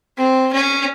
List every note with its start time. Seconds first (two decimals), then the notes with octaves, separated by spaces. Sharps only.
0.18 C4
0.53 C#4